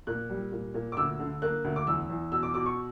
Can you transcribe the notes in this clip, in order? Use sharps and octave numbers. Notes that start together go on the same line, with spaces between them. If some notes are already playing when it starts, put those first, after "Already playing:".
A#2 F#6
G3
A#2
A#2
D6
D2 E6
D3
A#3 F#6
D2
D6
E2 E6
E2
B2 E6
D6
B2 D6
C#6